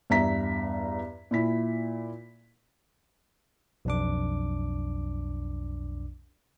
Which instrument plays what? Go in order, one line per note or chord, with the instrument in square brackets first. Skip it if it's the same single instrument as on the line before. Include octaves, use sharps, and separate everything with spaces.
[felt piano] E2 G2 E5 A#5 B6
A#2 E4 B6
[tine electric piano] B1 F2 D4 D6